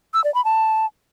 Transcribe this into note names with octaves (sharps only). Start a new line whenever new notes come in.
E6
D5
B5
A5